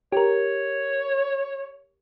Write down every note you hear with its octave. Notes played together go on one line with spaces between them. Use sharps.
G4 A#4 C#5